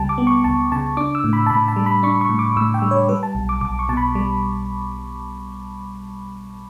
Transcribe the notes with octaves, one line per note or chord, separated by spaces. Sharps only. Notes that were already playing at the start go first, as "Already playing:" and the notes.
Already playing: C#2 C#3 G3 G5 A5
D6
B3
C#6
C#2 A5
C#3 A5
D4 D6
E6
A2
B5
A5
A2 B5
A5
G3
B5
D4 C#6
C#6
A2
D6
A2 E6
G5
G3
C#5
G3 B4
A5
B1
D6
B1 D6
C#6
B2 A5
B5
G3